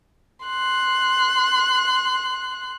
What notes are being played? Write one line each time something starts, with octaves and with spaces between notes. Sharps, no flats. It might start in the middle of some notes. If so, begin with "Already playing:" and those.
C6 F#6